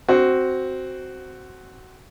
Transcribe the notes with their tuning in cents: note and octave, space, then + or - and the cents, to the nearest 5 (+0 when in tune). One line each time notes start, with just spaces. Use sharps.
C4 +0 F#4 +10